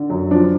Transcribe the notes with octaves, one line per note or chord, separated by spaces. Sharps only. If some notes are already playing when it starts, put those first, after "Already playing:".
Already playing: D3
F#2
F3 D4